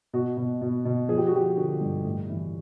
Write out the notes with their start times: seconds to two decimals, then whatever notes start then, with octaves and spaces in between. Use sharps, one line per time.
0.13 B2 F#4
0.37 B2
0.61 B2
0.85 B2
1.09 F3 G#4
1.18 G4
1.27 F#4
1.33 F3 G4
1.57 D3 F#4
1.81 G2
2.05 A2
2.29 E3